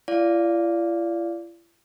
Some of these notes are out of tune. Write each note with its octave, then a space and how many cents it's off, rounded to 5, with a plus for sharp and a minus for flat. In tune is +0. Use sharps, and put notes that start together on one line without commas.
E4 +45 D5 -15 F5 +0